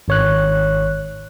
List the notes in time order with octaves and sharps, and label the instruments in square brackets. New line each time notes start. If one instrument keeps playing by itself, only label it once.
[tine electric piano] G#1 C#5 F#6